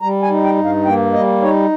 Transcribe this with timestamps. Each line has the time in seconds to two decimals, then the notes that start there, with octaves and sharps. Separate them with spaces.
0.02 G3 A#5
0.23 G#5
0.30 D#4
0.44 G5
0.57 G2
0.64 F5
0.85 A#3 G5
1.13 G3 D#5
1.41 D#4 C#5